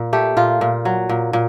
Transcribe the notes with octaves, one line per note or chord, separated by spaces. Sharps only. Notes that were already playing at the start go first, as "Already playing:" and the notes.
Already playing: A#2
A3 G4
A#2 F4
A#2
F#3
A#2
A#2